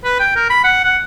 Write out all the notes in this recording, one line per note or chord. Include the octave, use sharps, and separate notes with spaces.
B4
G5
A#4
B5
F#5
F#5